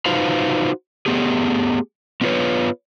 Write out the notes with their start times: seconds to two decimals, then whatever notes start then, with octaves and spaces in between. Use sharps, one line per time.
0.06 D#4 F4 F#4 B4 C5 F5
1.06 A3 B3 G4 G#4
2.21 B3 C#4 F4 F#4 B4 C#5